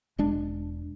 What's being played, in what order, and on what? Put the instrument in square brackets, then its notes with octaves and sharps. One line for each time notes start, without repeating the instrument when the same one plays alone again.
[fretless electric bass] E1 G#3 D4